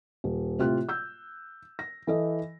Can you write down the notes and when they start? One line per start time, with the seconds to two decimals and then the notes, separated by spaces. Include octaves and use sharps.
0.24 D#1
0.59 A2 C3 F4 G5 F#6
0.89 E6 G6
1.79 A#6
2.07 E3 A4 D#5